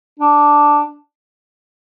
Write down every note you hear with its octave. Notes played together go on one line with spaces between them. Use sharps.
D4